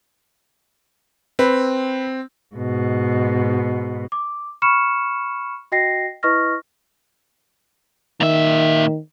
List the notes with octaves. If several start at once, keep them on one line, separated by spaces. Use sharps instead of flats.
C4 B4
G#2 B2
D6
B5 C#6 F6 C#7 E7
F#4 D#5 G5 A#6 C7
E4 B4 D#5 C#6 F6 A#6
A#2 D#3 E5